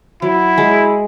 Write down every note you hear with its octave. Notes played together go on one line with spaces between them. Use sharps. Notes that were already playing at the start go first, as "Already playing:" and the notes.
F#3 E4
G#3 G#4